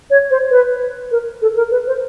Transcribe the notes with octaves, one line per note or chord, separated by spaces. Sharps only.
C#5
C5
B4
A#4
A4
A#4
B4
C5